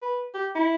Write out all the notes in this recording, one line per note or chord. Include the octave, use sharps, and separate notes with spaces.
B4
G4
E4